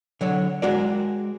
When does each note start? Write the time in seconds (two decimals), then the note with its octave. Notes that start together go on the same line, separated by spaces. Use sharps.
0.21 D3 F#3 C#5
0.62 G#3 F#4 A#4 D5